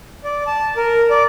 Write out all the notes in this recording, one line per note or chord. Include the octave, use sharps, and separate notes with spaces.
D5
A5
A#4
D5